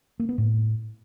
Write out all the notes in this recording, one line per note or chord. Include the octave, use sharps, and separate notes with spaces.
A#3
B3
A2